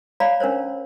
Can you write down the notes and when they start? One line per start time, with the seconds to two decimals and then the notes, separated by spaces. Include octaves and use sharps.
0.20 C#5 D5 F5 A#5 B5
0.40 C#4 D4 A#4 C5 C#5